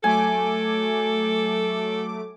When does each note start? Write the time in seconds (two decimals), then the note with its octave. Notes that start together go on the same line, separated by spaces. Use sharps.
0.04 F#3 A3 A4 G#5 D6